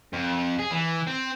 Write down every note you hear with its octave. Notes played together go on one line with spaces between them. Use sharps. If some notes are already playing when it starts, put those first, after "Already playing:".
F2
G#4
E3
C4